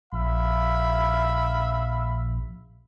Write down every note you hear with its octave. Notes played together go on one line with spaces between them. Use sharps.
A#1 E5 F5 B5